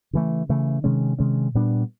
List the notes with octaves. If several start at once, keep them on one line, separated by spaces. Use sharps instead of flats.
C#3 E3 A3
C#3 E3 A3
C3 D#3 G#3 C#4
C3 D#3 G#3 C#4
A#2 G3 B3 D4